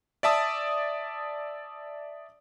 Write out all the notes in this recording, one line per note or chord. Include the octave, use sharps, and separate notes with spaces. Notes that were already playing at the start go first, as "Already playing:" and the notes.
D5 E5 A5 D#6